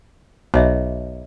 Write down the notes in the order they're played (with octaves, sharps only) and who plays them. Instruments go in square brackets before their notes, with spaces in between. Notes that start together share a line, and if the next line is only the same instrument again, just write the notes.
[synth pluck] B1 [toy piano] C#5 D#5 E5